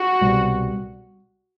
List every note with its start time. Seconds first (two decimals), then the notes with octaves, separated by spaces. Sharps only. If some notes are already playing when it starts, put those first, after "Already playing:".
Already playing: F#4
0.21 C2 B2 G3